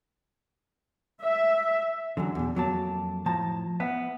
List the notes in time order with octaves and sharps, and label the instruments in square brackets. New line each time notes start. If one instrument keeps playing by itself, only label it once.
[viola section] E5
[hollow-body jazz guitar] D3 E3 F#3
E2 B2
F2 F#3 A#3 A5
A2 F3 A5 A#5
B3 B4 E5